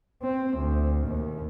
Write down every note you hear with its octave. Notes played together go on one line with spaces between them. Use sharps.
C4
D2
D#2